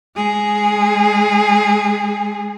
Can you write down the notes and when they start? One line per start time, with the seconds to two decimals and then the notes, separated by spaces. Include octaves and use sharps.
0.16 G#3 G#4